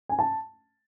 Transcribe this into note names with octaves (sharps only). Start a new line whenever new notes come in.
G#5
A5